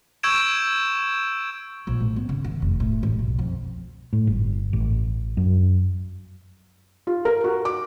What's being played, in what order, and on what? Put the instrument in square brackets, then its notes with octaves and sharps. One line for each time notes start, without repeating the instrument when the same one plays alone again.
[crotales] C#6 E6 G6 G#6 D7 E7
[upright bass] A#1
A2
B3
C#3
D#3
F1
A2
A1
B1
F2
[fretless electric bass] A2
G1
A1
F#2
[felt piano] F4
A#4
F#4
D6